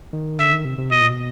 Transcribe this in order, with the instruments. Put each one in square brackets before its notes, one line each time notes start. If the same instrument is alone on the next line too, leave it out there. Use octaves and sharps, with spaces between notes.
[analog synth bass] D#3
[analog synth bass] D3 [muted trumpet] E5
[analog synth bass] D#3
C3
C3
[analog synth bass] B2 [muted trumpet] D#5
[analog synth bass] A#2
B2